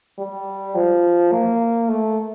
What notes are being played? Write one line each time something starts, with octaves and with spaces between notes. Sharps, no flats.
G3
F3
A#3
A3